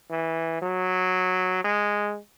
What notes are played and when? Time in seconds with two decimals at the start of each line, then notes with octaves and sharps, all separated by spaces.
0.10 E3
0.62 F#3
1.64 G#3